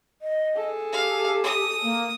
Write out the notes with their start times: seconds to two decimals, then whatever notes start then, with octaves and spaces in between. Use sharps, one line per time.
0.22 D#5
0.55 G#4 A4
0.93 G4 F5
1.44 D#6
1.82 A#3